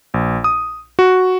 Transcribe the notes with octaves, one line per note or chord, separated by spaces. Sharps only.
A#1
D#6
F#4